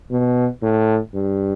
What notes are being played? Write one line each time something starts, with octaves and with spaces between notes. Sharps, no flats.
B2
A2
G2